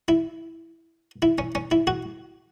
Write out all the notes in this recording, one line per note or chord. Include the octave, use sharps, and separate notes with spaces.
E4
E4
C#4
C#4
E4
F#4